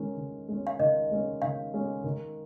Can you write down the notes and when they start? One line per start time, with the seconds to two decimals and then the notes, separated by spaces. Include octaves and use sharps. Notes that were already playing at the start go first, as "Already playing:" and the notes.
Already playing: D#3 G#3 C#4
0.17 D#3
0.48 G#3 C#4
0.67 F5
0.80 D#3 D#5
1.11 G#3 C#4
1.42 D#3 F5
1.74 G#3 C#4
2.04 D#3